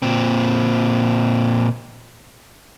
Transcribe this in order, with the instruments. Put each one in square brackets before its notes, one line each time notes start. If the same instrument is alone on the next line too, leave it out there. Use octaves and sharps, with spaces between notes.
[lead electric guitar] A#2 C4